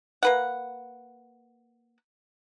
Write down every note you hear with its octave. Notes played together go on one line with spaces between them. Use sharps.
A#3 B4 F#5